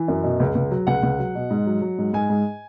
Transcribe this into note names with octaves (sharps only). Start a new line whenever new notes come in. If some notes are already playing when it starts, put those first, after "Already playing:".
Already playing: E3
F#2
B2
C#2
C#2
F#3
C#2 F#5
C#2
F#3
B2
G#2
F#3
F#3
G#2
G#2 G#5
G#2